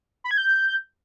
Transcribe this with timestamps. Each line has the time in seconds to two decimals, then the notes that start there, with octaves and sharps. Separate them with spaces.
0.24 B5
0.31 G#6
0.38 G6